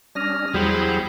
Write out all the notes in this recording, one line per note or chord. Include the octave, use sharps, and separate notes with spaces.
G3 C#4 D4 D#6 F6 A#6
E2 F#3 G3 E4 G#4 C5 B5